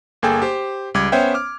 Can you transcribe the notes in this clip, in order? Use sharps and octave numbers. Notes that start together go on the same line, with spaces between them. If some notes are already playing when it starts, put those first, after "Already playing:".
G1 A#3 G#4 A4 G5 G#5
G4 C5
C#2 G3 D6 G#6
B3 C#4 C5 C#5 E5 G5
D6 F6